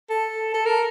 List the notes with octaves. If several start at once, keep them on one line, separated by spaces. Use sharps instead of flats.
A4
A4
A#4